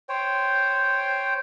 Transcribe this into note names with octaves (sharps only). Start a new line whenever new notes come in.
C5 C#5 G5